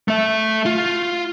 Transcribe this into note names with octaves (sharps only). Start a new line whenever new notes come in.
A3 E5
F4